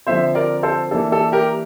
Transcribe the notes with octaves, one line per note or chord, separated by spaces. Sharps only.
D3 F3 C4 C5 E5
A#4 D5
A4 C5
E3 A#3 D4 A4
A4
G4 A#4